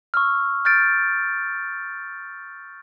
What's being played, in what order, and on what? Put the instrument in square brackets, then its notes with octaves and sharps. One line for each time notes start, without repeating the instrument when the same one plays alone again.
[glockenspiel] C#6 E6 F6
F6 G6 A6 D7